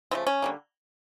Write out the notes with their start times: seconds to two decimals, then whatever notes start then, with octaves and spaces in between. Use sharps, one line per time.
0.11 C#3 F3 A3 C4
0.27 C#4
0.42 D3 G3 A#3